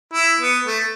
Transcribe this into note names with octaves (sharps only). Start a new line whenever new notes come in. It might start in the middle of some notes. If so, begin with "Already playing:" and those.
E4
B3
A3